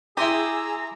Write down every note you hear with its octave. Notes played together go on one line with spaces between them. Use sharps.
E4 G4 G#4 A#5 C6 D#6 E6